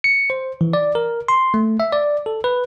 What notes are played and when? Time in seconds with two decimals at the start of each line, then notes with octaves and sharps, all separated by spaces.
0.04 C#7
0.30 C5
0.61 E3
0.73 D5
0.95 A#4
1.28 C6
1.54 A3
1.80 E5
1.92 D5
2.26 A4
2.44 B4